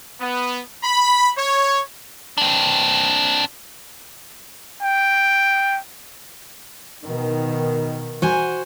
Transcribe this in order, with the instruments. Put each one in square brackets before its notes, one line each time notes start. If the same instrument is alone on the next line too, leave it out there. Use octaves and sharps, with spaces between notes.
[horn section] B3
B5
C#5
[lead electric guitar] C4 D4
[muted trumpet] G5
[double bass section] B2 D#3
[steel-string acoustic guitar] F#4 C5 G#5